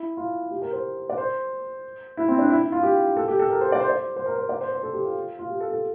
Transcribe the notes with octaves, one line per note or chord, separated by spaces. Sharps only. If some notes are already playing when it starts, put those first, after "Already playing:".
Already playing: E4
F4
G4
A#4
C5
D5
C5
E4
C4
D4
E4
E4
F4
G4
A4
G4
A4
A#4
C5
D5
C5
D5
C5
A#4
C5
D5
C5
C5
A4
G4
F4
F4
G4
A4
A4